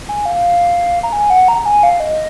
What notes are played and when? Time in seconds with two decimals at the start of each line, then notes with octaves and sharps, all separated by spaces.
0.09 G#5
0.26 F5
1.03 A#5
1.13 G#5
1.30 F#5
1.48 A#5
1.66 G#5
1.83 F5
2.00 D#5